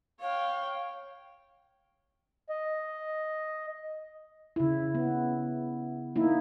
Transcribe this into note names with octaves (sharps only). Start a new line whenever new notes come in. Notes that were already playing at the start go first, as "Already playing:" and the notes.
C#5 F5 G5
D#5
C#3 E4
B3
A#3 D#4 E4